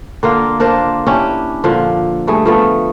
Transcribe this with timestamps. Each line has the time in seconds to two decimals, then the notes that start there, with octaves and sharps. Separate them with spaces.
0.23 D3 A#3 F4
0.60 D4 F4 A#4 C5
1.07 C#4 D4 E4 G4
1.64 A#2 D3 F3
2.27 G2 A3 G#4
2.45 F3 A3 B3